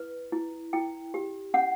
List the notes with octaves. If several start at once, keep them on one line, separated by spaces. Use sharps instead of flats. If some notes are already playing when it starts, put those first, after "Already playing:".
Already playing: E4 B4
E4
E4 G5
G4
C#4 F#5